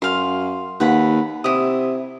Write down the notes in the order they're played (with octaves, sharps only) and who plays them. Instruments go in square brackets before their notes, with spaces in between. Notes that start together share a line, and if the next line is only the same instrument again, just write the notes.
[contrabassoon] F#2 [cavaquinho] F5 C6
[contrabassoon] D#2 [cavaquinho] B4 F#5 B5
[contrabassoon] C3 [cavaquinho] E4 D#6